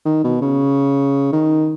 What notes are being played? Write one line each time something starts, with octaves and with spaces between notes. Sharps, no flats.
D#3
B2
C#3
D#3